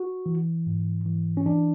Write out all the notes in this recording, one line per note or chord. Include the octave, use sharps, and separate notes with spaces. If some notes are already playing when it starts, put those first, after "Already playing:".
Already playing: F#4
E3
G#2
E3
C#4
E3 D4